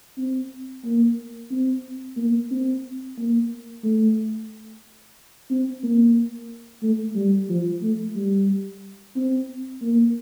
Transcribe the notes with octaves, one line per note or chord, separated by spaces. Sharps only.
C4
A#3
C4
A#3
C4
A#3
A3
C4
A#3
A3
G3
F3
A3
G3
C4
A#3